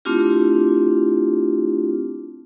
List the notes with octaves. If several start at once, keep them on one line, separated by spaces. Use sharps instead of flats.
A3 C4 D4 E4 F4 G4